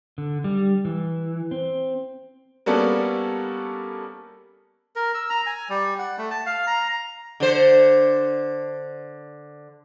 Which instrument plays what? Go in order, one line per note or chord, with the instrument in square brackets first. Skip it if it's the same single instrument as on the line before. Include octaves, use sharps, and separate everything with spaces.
[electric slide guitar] D3
G3
E3
C4
[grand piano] G3 A#3 B3 C#4 D4 A4
[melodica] A#4
E6
A#5
G#5
G3
F#5
A3
A5
F5
A#5
[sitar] D3 C5